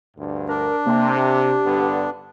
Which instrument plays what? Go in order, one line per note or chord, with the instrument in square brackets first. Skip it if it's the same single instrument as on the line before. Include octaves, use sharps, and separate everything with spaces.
[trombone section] D2 G2
[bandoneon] D4 [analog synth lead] A#4
[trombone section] C3 [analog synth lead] A#3
[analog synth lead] G4
[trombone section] G2 D3 B3